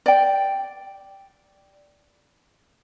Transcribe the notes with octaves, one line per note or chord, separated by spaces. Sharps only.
D5 G5